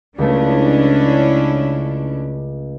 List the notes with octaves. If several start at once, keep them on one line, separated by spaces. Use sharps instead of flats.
C#2 A3 C#4 D4 E4